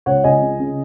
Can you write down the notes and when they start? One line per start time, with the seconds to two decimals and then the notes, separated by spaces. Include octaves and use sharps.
0.06 C#2 C#5 F#5
0.24 C#2 D#5 G#5
0.42 C#3
0.59 C#3